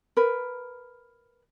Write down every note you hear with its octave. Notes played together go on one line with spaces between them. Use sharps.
A#4 B4